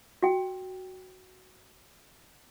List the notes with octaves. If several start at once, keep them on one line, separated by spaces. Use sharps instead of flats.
F#4 G5